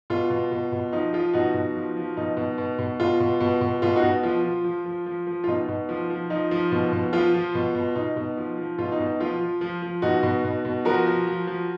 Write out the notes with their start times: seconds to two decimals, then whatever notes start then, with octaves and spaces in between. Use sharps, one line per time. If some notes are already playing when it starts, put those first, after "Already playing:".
0.10 B2 F4
0.30 B2
0.51 B2
0.72 B2
0.93 F3 D#4
1.13 F3 F4
1.33 B2 D#4 F#4
1.54 B2
1.75 F3
1.97 F3
2.17 B2 D#4
2.37 B2
2.58 B2
2.79 B2
3.00 B2 F4
3.20 B2
3.41 B2
3.61 B2
3.82 B2 F4
3.96 D#4 F#4
4.03 B2
4.23 F3 F4
4.44 F3
4.64 F3
4.85 F3
5.06 F3
5.27 F3
5.44 F4
5.48 B2 D#4
5.68 B2
5.89 F3
6.10 F3
6.30 F3 D#4
6.51 F3
6.72 B2
6.92 B2
7.13 F3 F4
7.34 F3
7.55 B2
7.75 B2
7.95 B2 D#4
8.16 B2
8.37 F3
8.58 F3
8.78 B2 F4
8.92 D#4
8.99 B2
9.06 D#4
9.20 F3 F4
9.40 F3
9.61 F3
9.82 F3
10.02 B2 D#4 F#4
10.23 B2
10.44 B2
10.65 B2
10.85 F3 F#4 A#4
11.06 F3
11.27 F3
11.47 F3